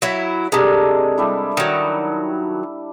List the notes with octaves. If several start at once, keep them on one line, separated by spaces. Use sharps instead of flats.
F#3 E4
C3 G#3 D4 A4 A#4
G3 D4 E4
D#3 F#3